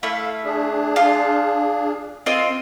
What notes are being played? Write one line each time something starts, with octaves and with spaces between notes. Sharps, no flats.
A3 E4 F5
D4 G#4
F4
C4 F4 D#5